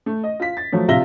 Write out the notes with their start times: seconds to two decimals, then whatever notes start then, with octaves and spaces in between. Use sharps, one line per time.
0.06 A3
0.24 D#5
0.40 F4 B6
0.57 A6
0.72 F3 F#3 A3
0.88 A#1 C3 F4 E5 A#6 G7